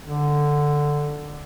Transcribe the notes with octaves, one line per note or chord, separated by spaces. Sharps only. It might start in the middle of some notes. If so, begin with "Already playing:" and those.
D3